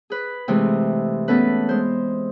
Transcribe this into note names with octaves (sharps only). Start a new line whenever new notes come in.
G#4 B4
C3 E3 G#3 A3
A3 B3 C#4 A4 B4
G#3 C5